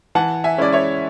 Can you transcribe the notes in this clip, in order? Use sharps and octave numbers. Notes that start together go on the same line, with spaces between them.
E3 F#5 A5
E5 G#5
G#3 C#4 E4 D5
C#5 E5